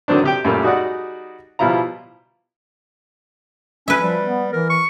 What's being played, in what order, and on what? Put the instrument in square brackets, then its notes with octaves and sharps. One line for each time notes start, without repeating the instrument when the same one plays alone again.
[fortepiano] D3 D#3 F#3 C4 D4
C3 G4 G5
F#2 A#2 G3 A3 A#3
G3 D#4 F#4 G#4 D5 F#5
B2 F3 G3 E4 F4 A#5
[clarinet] C#4 [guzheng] B4 E5
[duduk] F3 [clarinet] G3
[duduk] B3
[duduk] E3 [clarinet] A#4
[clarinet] C#6